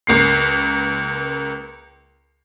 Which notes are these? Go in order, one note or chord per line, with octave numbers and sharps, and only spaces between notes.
C#2 A#3 C7